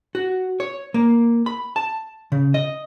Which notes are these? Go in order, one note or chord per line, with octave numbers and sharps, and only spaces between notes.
F#4
C#5
A#3
B5
A5
C#3
D#5